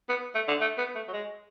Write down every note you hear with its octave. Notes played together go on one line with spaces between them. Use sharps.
B3
A3
D3
A3
B3
A3
F#3
G#3